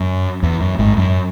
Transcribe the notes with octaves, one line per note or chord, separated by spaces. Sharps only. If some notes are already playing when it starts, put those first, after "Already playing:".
Already playing: F#2
E2
F#2
G#1 G#2
F#2